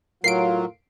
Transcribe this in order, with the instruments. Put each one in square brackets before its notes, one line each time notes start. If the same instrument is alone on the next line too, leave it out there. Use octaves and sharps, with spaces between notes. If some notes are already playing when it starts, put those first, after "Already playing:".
[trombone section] A2 F4 [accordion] F#3 [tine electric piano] A#4 F5 [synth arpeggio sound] C7 D7